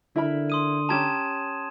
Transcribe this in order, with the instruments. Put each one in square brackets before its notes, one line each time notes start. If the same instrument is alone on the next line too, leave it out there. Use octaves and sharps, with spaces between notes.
[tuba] D3 [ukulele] E4 A#4 B5
[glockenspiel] C6 D#6 D#7
[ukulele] C#4 G4 A#5 [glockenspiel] A5 G#6 E7